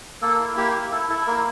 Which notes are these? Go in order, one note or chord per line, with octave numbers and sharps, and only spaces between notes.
A#3 A4
E4
A#3 G4
E4
E4 A4
E4 A4
A#3 A#4